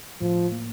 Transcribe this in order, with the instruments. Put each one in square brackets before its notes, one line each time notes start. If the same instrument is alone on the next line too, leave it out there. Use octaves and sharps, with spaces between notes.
[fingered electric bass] A2 [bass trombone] F3
[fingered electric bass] A#3